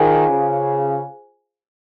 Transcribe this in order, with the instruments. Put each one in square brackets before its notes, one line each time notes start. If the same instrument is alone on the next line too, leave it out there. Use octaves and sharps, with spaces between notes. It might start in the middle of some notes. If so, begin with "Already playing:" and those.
Already playing: [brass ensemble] D#3 [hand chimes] F4 G#4 C5 F5 G#5
[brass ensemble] C#3